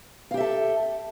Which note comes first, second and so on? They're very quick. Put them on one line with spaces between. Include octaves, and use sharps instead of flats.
F5 G4 E5 A4